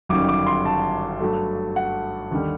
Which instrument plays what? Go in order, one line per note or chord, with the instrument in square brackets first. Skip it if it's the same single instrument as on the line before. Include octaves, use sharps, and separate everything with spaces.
[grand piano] G1 F#2 D#3 G3 D6
D6
C6
A5
G2 F#3 A3
F#5
D#2 D3 G3